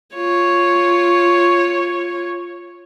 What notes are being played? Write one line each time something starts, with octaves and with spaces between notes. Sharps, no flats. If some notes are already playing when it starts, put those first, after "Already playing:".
F4 C#5